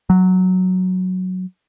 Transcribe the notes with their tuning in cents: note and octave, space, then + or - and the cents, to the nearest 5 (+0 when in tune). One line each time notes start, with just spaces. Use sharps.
F#3 +0